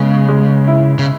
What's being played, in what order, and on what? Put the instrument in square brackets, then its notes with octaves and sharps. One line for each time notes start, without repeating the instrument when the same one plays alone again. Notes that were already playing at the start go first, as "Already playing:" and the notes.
Already playing: [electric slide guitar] C#3 [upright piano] G#3 B3
[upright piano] G#3
E4
[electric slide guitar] C#3